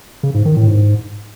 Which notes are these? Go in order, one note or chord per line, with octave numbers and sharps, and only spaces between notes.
C#3
G#2
D#3
A2
G#2